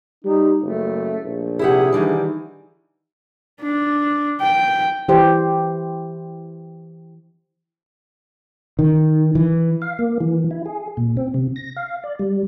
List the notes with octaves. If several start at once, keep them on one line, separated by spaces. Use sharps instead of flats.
G3 D#4
F#1 A3
A#1
C3 E4 G4 G#4 F#5
D#3 E3 G3 D4
D4
G5
E3 G4 C5
D#3
E3
F5
A#3
E3
E4
G#4
A#2
C4
C3
A#6
F5
D5
G3